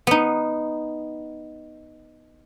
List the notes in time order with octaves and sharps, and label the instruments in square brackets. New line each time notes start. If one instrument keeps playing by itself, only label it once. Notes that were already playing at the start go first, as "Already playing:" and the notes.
[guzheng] B3 D#4